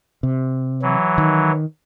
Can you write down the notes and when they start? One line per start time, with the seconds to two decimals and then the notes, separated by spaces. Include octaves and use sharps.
0.23 C3
0.82 E3 F#3
1.18 D#3